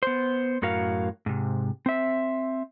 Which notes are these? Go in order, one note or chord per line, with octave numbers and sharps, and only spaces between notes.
B3 C5
F#2 A2 F#4 A#4 F5
G#2 C3
C4 E5